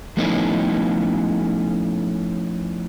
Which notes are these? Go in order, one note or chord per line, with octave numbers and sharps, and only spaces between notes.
F3 A3 B3 C#4 D#4 E4